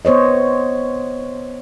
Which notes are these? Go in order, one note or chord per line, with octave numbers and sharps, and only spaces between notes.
B3 C5 C#5 D#5